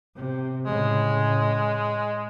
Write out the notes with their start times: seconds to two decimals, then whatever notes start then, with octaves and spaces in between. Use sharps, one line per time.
0.15 C3
0.66 A2 C#3 G#3